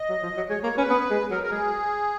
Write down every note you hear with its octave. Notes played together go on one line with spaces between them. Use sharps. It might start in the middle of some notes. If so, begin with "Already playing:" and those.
Already playing: D#5
F#3
F3
F#3
G#3 C#5
A#3 C#5
C#4 B4
B3
G#3
F#3 A#4
A#4
G#3 G#4